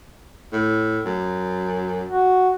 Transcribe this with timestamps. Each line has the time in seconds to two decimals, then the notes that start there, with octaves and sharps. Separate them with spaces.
0.53 A2
1.05 F#2
2.08 F#4